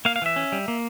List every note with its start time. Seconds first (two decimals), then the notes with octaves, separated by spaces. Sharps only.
0.05 A#3 F5
0.16 F5
0.22 E3 E5
0.36 C#4
0.52 G3
0.68 A#3